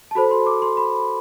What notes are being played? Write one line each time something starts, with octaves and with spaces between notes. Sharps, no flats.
A5
F#4 A4 C5 B5
C6
D6
C6
B5